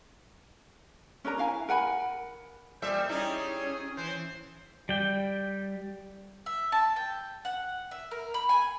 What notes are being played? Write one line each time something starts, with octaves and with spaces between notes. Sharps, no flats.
C#4 D4 A#4 A#5
E4 F5 G#5
A#4 F#5 G#5 B5
A#2 G3 C5 E5
G3 C#4 D#4 E4 G#4
E3 C5
G3 G5
E5
A5
G5
F#5
E5
A#4
B5
G#5